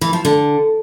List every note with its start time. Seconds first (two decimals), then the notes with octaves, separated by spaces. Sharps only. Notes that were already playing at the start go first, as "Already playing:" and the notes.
0.01 E3
0.13 F3
0.25 D3